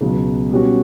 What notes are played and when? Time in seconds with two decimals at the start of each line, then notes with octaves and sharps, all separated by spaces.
0.01 C#2 B2 F#3
0.51 B2 G3 C#4 F#4